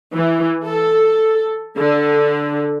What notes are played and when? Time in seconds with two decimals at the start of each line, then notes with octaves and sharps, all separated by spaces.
0.14 E3
0.65 A4
1.78 D3